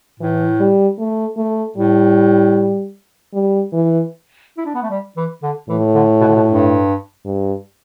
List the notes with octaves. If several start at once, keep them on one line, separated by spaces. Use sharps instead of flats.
A2 E3
G3
A3
A3
A2 G3
G3
E3
E4
D4
B3
A3
G3
E3
D3
A2 E3
D3
B2
D3
B2
G2
G2